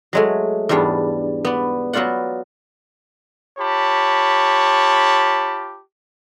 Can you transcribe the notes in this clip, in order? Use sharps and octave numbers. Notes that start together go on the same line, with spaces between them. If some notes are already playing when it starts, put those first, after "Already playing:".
F#3 G#3 A3
E2 G#2 G3 D4
B3 D5
F#3 B3 F4 D5 F#5
F4 G4 C#5 A5 B5